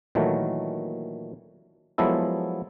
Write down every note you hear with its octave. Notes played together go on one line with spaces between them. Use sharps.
A#2 D#3 E3 F#3 A3
F3 F#3 G#3 B3 E4 A4